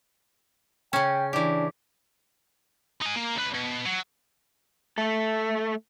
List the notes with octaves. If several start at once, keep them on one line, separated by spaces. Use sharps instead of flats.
C#3 C#4 G5
E3 D4 G4
D#4 G#5
A#3
C#2 B4
B2
F#3
A3 A4